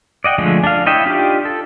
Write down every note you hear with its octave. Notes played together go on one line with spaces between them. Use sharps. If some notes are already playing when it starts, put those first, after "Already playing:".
D5 D#5 F#5 G5
D3 F3 G#3 A3
D4 F5
E4 C#5 D#5 E5 G5
D4 D#4 F4 G4
A4